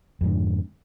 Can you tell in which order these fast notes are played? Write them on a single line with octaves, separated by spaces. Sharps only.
F2 G#2 D3